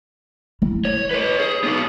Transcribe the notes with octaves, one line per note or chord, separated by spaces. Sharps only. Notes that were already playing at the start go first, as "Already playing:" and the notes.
E4
C#5
B4 C#5
G#4
B3 D#4